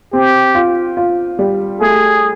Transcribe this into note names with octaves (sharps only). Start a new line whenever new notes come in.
C4 G4
F4
F4
G3
A3 G#4